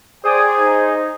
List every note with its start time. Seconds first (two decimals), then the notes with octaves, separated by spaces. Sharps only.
0.24 G#4 C5 D5 G5 D#6
0.58 D#4